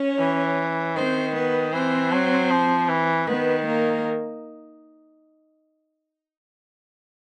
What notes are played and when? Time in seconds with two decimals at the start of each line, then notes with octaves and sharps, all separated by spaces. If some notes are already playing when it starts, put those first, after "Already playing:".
Already playing: C#4 C#5
0.19 E3
0.96 D#3 C4 C5
1.35 B3 B4
1.73 E3 C4 C5
2.12 F#3
2.51 F3
2.89 E3
3.27 D#3 B3 B4
3.67 A#3 A#4